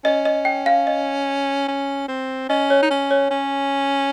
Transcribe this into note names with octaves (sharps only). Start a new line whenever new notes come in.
C#4 D#5
D#5
G5
F5
D#5
C#4
C4
C#4 D#5
C#5
D#4
C#4
C#5
C#4